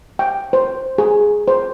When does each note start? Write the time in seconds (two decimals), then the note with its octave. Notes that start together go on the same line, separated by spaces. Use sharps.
0.19 G5
0.53 C5
0.98 G#4
1.48 C5